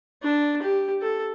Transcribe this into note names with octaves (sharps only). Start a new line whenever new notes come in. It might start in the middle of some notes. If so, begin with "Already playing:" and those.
D4
G4
A4